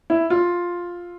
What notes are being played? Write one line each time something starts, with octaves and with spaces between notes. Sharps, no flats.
E4
F4